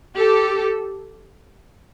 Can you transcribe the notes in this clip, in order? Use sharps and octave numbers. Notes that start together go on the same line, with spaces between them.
G4 A4